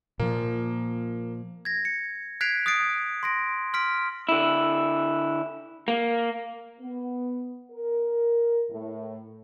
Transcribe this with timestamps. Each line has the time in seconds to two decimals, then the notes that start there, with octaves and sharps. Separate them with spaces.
0.19 A#2 F3 A#3
1.65 G#6 A#6
1.85 C#7
2.41 F#6 G#6 B6 C7 D7 F7
2.66 D#6 F#6 A6 C7 D7
3.23 C6 A#6 D7
3.74 C6 F6 B6 D7
4.29 D3 E4
5.88 A#3
6.80 B3
7.72 A#4
8.70 A2